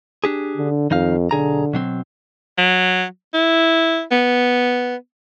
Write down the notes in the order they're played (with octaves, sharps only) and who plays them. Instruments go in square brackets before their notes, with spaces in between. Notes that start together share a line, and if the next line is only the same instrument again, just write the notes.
[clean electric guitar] D4 G4 G#4
[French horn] D3
[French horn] F2 [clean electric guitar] D#3 D#4 F5
[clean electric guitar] B1 G#4 A#5 [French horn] D3
[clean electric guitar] B2 F#3 C4
[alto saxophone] F#3
E4
B3